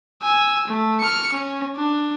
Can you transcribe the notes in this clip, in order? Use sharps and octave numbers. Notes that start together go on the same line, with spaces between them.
G#5 E6
A3
F6 C#7
C#4
D4